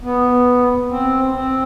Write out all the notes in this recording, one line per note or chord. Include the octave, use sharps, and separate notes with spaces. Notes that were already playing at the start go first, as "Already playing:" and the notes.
B3
C4
C4